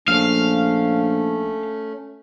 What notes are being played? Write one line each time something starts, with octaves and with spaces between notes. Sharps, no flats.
A#1 A3 C#4 F5